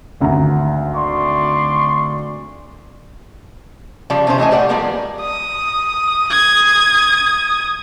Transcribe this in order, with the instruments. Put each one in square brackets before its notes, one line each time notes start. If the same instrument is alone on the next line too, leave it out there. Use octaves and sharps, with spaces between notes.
[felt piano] G#1 D2 A#5
[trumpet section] D5 C6 C#6
[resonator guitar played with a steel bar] C#3 F3 G3 D5
C3 E3 C#4 D#4 C5
E3 A3 D#5 G#5
A2 G3 D5 F#5 G5
F3 G3 G#3 A#3 B3 D5
[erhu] D#6
[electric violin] G#6